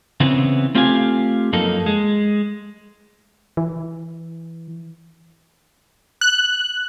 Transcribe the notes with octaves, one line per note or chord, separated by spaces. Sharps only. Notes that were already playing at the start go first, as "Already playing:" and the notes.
C#3 E3 B3 C4
A3 C4 F4 G4 F5 G#5
F#2 F3 A#3 D#4 A4
G#3
E3
F#6